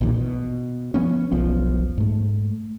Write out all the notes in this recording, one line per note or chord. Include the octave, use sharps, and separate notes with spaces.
A#1 E2 A#2 D#3
B2
F3 B3 C#4
E1 B1 F3 B3
G#2 A3